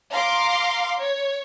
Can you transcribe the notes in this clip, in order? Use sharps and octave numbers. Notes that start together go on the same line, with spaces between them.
F5 A#5 C6 D6
C#5